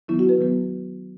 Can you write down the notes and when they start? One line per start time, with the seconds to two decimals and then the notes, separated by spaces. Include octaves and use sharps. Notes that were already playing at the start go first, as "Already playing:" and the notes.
0.08 D#3 F#3 B3 E4
0.19 F#4
0.29 B4
0.38 D#3 F#3 B3